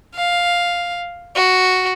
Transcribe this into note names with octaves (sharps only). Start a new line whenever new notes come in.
F5
F#4